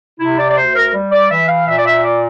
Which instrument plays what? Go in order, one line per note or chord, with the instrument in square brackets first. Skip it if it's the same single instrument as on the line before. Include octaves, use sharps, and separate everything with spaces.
[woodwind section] C3 E4
D5
D5
D2 C5
A#4
G3
D5
E3 E5
F5
A#2 E5
D5
E5
D5